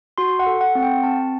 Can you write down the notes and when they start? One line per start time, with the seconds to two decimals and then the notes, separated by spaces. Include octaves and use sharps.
0.18 F#4 C6
0.39 F#5
0.47 A4
0.61 F#5
0.75 C4 F#5
0.83 G5
1.03 C4 A5